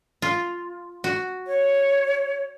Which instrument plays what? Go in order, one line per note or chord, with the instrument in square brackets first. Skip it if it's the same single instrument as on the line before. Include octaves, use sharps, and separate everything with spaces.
[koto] F4
F#4
[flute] C#5